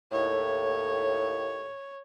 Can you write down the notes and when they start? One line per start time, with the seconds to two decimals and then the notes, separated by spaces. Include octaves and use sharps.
0.12 D#2 A2 C#5